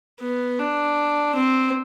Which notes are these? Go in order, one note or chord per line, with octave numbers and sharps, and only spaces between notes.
B3
D4
C4